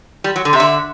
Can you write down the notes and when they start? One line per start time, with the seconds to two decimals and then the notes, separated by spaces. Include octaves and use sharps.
0.24 G3
0.36 F#3
0.45 D3
0.53 C3
0.56 E5
0.60 D3